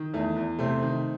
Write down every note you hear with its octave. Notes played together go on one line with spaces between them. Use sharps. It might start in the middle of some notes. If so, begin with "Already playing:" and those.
Already playing: D#3
E2 A3
E2
C3 A3 C4
D#3